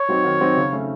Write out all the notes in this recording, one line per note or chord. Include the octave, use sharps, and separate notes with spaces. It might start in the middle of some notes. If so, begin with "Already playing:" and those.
Already playing: C#5
F#3 C4 D#4
D#3
F#3 C4 D#4
C#3
A3 C#4